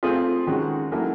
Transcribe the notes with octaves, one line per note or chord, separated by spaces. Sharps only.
A3 C4 F4 G#4
D#3 G#3 C#4 F#4
F#3 A#3 C#4 E4 A4